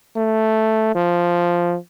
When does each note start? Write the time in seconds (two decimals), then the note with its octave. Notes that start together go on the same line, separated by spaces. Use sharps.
0.17 A3
0.95 F3